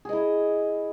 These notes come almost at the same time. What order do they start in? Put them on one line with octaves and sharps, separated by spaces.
G#4 D#5 E4